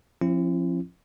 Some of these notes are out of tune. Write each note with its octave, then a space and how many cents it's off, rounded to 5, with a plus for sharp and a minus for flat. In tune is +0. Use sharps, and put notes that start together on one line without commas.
F3 +0 C4 +45 E4 +40